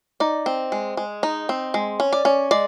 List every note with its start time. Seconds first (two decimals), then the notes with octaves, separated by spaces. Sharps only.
0.20 D#4 D5
0.46 C4
0.72 G#3
0.97 G#3
1.23 D#4
1.49 C4
1.74 G#3
2.00 C#4
2.13 D5
2.25 C#4
2.51 G#3 D5